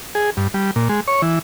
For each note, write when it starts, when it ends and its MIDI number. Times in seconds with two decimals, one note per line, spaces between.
0.15 0.30 68
0.37 0.48 43
0.54 0.71 55
0.76 0.88 46
0.89 1.00 56
1.08 1.22 73
1.22 1.39 52